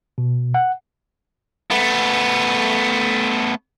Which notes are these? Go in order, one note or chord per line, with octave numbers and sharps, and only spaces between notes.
B2
F#5
A3 B3